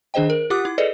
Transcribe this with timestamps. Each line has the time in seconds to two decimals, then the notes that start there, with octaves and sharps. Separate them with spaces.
0.14 D#3 D4 G#4 C5 D#5 G5
0.30 A#4
0.50 F4 G4 F#5 D6 D#6 F#6
0.65 E4 D6
0.78 G#4 A4 B4 D5 D#5